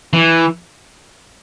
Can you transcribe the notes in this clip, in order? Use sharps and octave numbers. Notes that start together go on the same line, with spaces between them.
E3